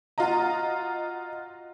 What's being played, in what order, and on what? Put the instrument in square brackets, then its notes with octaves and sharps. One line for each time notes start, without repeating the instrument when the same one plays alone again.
[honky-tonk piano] F4 F#4 D#5 A#5